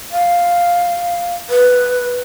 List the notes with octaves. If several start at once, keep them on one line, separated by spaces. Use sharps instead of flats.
F5
B4